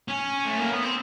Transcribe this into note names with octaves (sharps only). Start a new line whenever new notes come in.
C#4
A3
A#3
B3
C4